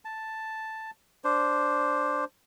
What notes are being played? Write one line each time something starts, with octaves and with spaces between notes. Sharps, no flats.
A5
D4 C5